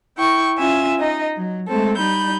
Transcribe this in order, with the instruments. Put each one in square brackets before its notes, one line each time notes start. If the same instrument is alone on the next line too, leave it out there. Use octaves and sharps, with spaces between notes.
[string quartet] E4 G5 C#6
C#4 F4 E5 G#5
D#4 D#5
F#3
G#3 A3 C4 A4
G3 D#4 B5 G6